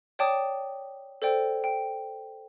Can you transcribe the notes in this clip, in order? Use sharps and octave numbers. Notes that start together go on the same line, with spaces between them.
C#5 D5 G5 A5 D6 D#6
A4 C5 D5 G5
G5